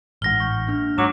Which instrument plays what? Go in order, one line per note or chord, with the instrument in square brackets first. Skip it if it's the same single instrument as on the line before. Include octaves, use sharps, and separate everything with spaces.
[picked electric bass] A1 G#2 [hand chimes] F#5 F6 [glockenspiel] A#6 G7
[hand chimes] C#6 G6
A#3 D4 F6
[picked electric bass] G#2 [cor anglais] F#3 [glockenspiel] D6 E7 [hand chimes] A#6